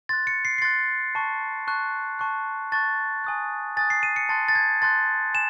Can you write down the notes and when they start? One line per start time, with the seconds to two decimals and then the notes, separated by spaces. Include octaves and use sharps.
0.09 C6 F#6 A6
0.27 C#7
0.45 C7
0.58 C7
0.62 C6 F#6 A6
1.15 A5 C#6 F#6
1.67 A5 C#6 F#6
2.19 A5 C#6 F#6
2.72 A5 C#6 F#6 A6
3.24 G#5 D#6 F#6
3.77 G#5 D#6 F#6 A6
3.90 C7
4.03 D#7
4.16 C#7
4.29 A5 C6 F#6 A6
4.48 A6
4.55 G#6
4.82 A5 C6 F#6 A6
5.34 G#5 E7